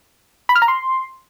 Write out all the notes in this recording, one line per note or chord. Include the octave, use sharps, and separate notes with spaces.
B5
F6
A#5
C6